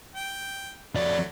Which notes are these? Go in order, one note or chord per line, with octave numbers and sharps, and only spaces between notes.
G5
F2 F#3 A3 D5